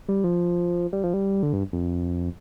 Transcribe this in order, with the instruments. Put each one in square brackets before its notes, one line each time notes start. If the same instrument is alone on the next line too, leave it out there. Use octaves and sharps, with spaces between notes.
[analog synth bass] G3
F3
G3
F3
G3
D3
G2
F2